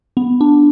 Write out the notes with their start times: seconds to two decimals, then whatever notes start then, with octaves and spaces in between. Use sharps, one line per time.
0.17 B3
0.41 D4